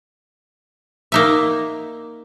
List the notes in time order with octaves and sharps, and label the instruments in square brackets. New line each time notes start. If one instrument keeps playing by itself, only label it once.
[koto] A#3 D#4 E5